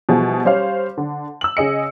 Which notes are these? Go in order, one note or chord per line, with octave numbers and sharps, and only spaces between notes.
B2 E3 F3 G3 F#4 G#4
G3 C#4 C5 C#5 F5
D3
E6 F#7
C#3 G#4 D#5 C#7